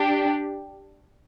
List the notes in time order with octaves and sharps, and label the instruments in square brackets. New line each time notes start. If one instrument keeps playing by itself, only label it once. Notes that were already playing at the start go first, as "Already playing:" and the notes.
Already playing: [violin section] D4 G4